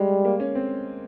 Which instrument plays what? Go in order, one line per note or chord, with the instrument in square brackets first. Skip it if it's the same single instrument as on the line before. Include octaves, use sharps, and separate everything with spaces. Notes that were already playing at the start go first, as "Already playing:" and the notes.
Already playing: [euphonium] G3 [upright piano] G#3
[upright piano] A#3
C#4
C4